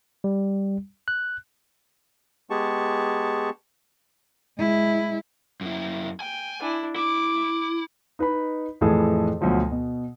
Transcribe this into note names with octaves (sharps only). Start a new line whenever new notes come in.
G3
F#6
G#3 B3 G4 G#4 A5 C#6
G#3 E4
F#2 E4
G5 G#5
D4 E4
E4 D6
D#4 B4 D#5 B5
F2 A2 E3 G#4 A4
D2 B2 F3 F#3
B2